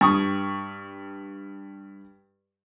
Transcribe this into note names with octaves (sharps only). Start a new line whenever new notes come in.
G2 C#6 D#6